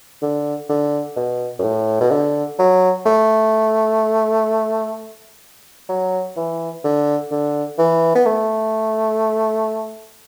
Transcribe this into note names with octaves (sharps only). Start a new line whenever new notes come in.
D3
D3
B2
F#2
A2
B2
D3
F#3
A3
F#3
E3
D3
D3
E3
B3
A3